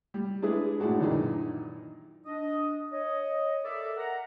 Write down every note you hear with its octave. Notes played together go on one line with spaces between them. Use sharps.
G3
G#3 D4 E4 G#4 B4
A2 G#3 D4 F#4
F#2 A#2 D#3 E3 D4 D#4
D4 D#5
C#5 D#5
A4 A#4 D5 E5
A#4 F#5 A#5